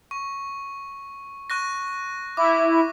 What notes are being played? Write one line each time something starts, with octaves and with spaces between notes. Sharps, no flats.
C#6
C#6 F#6 A#6
E4 D6